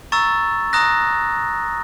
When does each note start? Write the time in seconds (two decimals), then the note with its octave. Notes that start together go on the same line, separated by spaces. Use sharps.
0.12 A#5 C#6 E6 A6
0.73 A#5 D#6 F#6 A#6